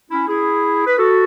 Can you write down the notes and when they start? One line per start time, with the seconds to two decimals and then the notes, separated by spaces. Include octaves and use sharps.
0.11 C#4 E4
0.28 E4 G#4
0.86 B4
0.98 F#4 A4